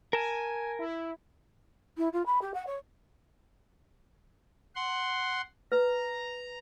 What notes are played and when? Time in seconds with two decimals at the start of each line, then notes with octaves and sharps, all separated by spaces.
0.13 A#4 G#5 A5
0.79 E4
1.97 E4
2.13 F4
2.26 B5
2.41 G4
2.54 F#5
2.67 C#5
4.75 F#5 C6
5.72 B4 A#5